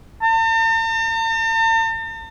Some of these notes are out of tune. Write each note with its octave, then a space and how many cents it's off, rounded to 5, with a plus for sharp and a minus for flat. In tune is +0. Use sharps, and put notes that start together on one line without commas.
A5 +45